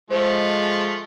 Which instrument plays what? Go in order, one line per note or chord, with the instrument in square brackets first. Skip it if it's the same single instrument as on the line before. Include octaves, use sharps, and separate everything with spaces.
[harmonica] F3 A3 [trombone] G#3 [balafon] C5